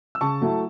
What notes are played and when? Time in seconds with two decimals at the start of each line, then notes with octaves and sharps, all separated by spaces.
0.15 E6
0.21 C#3 A5 C#6
0.41 F#3 A3 E4